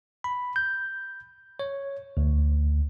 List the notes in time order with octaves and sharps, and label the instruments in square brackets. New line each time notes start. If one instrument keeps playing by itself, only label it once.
[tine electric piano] B5
G6
C#5
D2